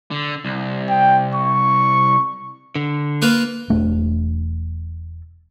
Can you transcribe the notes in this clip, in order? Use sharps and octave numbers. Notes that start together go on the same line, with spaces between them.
D3
C2
G5
C#6
D3
A#3 F4 B4
E1 A3 D4